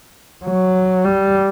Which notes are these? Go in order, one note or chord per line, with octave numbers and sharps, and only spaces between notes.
F#3
G3